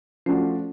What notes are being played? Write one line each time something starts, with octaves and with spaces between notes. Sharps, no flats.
F3 A3 C#4 D4 F#4